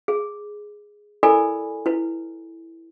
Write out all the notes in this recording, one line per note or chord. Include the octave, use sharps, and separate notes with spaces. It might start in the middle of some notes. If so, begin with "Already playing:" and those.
G#4
E4 A4 A#4 D5 G#5 B5
E4 B4